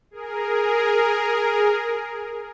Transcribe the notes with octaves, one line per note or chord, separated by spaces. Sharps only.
G#4 A#4